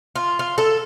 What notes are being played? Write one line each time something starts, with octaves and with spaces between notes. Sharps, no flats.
F4
F4
A4